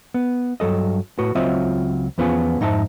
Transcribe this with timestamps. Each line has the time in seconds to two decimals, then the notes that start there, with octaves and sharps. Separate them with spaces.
0.14 B3
0.60 G2 F#3 A4 D#5
1.19 A2 F#4 B4
1.35 C#2 F#3 C4 F4 D#5 E5
2.18 E2 F3 B3 C#4 F4 G#4
2.60 F2 G#2 D#4 G#4 E5 A5